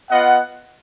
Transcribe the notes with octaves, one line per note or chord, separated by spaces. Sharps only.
B3 F4 D#5 F#5